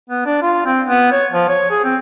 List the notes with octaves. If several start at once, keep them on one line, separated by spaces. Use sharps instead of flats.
B3
D4
F4
C4
B3
C#5
F3
C#5
G#4
C4